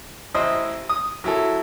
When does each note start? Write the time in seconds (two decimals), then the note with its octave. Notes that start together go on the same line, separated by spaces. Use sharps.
0.34 A1 E4 C5 D#5
0.89 D#6
1.24 F#3 E4 A4